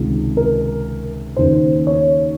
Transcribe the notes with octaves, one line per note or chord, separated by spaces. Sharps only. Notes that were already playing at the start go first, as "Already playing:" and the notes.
Already playing: C#2 C3 D#3
A#4
D#2 C#3 C5
C#5